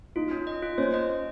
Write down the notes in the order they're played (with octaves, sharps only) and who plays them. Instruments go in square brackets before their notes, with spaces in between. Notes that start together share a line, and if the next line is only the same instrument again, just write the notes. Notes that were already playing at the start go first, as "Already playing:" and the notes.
[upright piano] D#4 [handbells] F4
[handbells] C#4
D#5
F4
[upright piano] C#4 [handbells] C5
[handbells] D#5
D#5